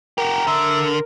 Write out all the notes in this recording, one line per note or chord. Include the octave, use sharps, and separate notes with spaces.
F#4 G4 A#4
D3 E5